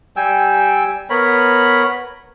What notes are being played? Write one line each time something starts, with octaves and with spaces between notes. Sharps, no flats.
G3 G5 G#5 E6
B3 A#4 C#5 B5